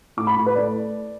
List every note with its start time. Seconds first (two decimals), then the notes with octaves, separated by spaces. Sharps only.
0.17 A2 D6
0.27 B5
0.37 A2
0.46 B4
0.55 A3 D5